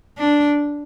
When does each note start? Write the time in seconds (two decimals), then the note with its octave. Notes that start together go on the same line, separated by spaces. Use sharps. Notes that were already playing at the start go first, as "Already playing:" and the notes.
0.18 D4